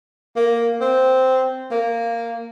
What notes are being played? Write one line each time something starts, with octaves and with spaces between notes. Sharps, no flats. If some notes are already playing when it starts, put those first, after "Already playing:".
A#3
C4
A#3